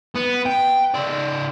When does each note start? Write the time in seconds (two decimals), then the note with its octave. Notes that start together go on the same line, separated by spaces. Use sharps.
0.16 B3
0.46 G5
0.94 C#3 D5